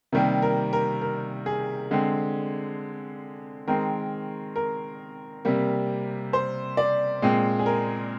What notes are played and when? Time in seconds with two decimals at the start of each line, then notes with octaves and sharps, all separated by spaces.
0.12 C3 D#3 G3 A#3 A#4
0.42 A#4
0.73 A#4
1.02 A#4
1.46 G#4
1.91 D3 G#3 C4
3.67 D#3 G#3 C4 A#4
4.56 A#4
5.45 C3 G3 A#3
6.33 C5
6.77 D5
7.22 A#2 G#3 C4
7.59 G#4
7.66 A#4